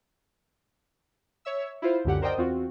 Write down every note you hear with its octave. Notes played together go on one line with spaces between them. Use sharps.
C#5 E5 E6
E4 F4 C5
C#2 F#2 D3 G4 F#5
A#4 C5 D5 D#5 G5 D#6
E2 C4 F4 F#4